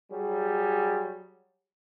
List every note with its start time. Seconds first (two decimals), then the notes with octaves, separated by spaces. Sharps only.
0.11 F#3 G3 G#4